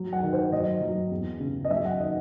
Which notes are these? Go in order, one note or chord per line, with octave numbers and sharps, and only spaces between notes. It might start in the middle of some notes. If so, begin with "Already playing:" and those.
Already playing: F#3
F#5
D#3
C5
F#3 D#5
F#3
E2
C#3
D#5
F#3 E5
F#5
D#3 D#5